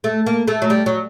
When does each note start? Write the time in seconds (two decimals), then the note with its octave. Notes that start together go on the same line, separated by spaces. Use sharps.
0.04 A3
0.26 A#3
0.48 A3
0.62 F#3
0.70 G3
0.86 F#3